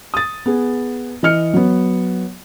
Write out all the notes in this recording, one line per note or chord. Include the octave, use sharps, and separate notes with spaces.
D#6 A6
B3 G#4
E3 D#5 F6 C#7
F#3 B3